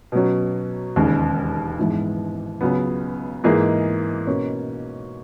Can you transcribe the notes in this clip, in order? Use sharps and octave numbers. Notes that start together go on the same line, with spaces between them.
B2 F#3 C#4
E1 D#2 C#3 G#3
A#1 G#2 E3 G#3 B3
C#2 C#3 F#3 B3
G#2 E3 A#3 D#4 G#4
B2 A#3 C#4